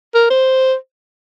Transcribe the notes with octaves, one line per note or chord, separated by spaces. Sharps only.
A#4
C5